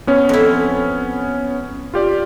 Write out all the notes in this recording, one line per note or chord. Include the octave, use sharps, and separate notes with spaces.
B3 C#4 C#5
F2 E4
F4 G4 D5